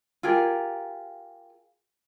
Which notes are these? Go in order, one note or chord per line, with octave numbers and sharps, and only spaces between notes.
F4 G4 G#4 A#4